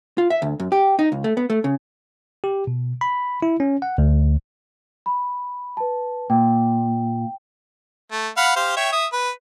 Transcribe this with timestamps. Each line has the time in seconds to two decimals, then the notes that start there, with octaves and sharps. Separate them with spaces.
0.18 F4
0.30 E5
0.42 D2
0.60 F#2
0.72 G4
0.99 D#4
1.12 C#2
1.24 A3
1.37 B3
1.50 A3
1.64 C#3
2.44 G4
2.67 B2
3.01 B5
3.42 E4
3.60 C#4
3.82 F#5
3.98 D2
5.06 B5
5.77 B4 A5
6.30 A#2 G5
8.12 A3
8.37 F5 F#5 B5
8.56 G4 C5 F5
8.77 C#5 E5 G5
8.93 E5 D#6
9.13 B4